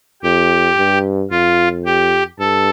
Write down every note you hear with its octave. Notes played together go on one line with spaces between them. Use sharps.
F2 G4
G2
F2 F4
G4
G2 A4